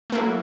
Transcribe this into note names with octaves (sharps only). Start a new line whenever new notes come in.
F#3 A3 A#3 E4